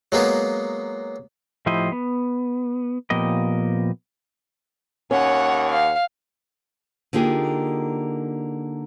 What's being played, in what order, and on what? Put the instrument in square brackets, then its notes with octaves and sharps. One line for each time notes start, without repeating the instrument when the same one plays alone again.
[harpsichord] F#3 G#3 A#3 B3
[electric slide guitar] A2 F3 E4 G4 C5 D#5
B3
A#2 F3 B3 G4 A#4 D#5
[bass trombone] D#2 [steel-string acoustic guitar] C#4 [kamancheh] C#5 F#5
[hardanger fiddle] F5
[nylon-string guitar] D3 A#3 D#4 F4 G4 G#4